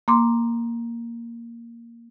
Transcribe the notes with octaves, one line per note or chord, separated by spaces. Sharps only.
A#3 C6 D6